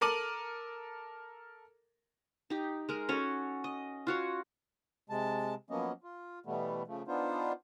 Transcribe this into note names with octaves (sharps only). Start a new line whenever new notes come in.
A4 A#4 D6 D#7 F#7
D#4 G4
G#3 A#4
C#4 F#4 A4 C#5
D#5
F4 F#4 C#5
C3 G#3 A5
F3 F#3 A#3 B3 C#4 D#5
F4
B2 E3 G3 A3 B3
C#3 F3 A3
B3 D4 D#4 F4 C5